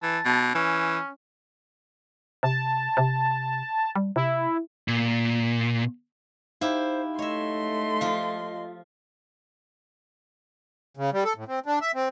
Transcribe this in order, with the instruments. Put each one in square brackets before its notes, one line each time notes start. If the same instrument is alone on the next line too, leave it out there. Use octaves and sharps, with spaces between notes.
[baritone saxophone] E3 [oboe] A5
[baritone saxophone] B2
[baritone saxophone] E3 [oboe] C#4
[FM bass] C3 [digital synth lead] A5
[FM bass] C3
G3
[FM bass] C3 [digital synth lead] E4
[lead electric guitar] A#2
[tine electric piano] D#4 F5 [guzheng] E4 G4 [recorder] C5
[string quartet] A3 C6 [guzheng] C#5 E5 [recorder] D#5
[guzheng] F3 F4
[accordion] C#3
G3
A4
A2
C4
D4
E5
C4